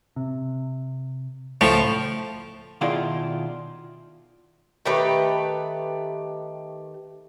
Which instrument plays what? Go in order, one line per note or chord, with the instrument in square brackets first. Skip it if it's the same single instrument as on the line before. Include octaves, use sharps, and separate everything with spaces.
[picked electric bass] C3
[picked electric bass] C#2 [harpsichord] A2 F3
[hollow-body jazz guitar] B2 D#3 E4 F4 G#4 D5
[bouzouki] D#3 A3 G4 B4